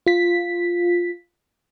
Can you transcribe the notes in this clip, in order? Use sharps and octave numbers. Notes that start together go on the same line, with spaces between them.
F4 B6